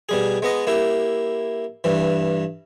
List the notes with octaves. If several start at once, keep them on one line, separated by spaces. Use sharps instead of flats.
B2 G3 G#4
G#3 B3 D#5
A#3 E4 G4
G2 E3